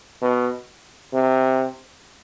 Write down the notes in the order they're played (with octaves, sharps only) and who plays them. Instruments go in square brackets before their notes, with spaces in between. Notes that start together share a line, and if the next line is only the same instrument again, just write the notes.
[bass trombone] B2
C3